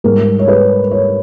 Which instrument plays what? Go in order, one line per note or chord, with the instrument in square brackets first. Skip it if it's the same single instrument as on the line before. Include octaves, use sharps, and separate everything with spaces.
[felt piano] G#2 G3 A#4
C#5
B4
C#5